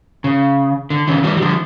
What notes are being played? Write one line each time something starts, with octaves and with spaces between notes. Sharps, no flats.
C#3
D3
C#3 E3
E3 G3
G3
D3 F3